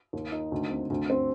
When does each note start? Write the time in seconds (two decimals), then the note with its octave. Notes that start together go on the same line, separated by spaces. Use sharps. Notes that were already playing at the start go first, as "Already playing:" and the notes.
0.13 D#2
0.32 D#4
0.52 D2
0.71 C4
0.90 D2
1.10 C4